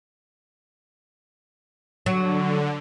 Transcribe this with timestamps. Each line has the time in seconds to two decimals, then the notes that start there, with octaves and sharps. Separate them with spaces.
2.06 D3 F#3